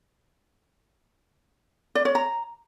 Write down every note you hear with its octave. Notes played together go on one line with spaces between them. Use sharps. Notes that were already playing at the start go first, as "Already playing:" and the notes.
D5
C#5
A#5